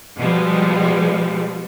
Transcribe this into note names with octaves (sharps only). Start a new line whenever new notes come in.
B2 F3 G3 G#3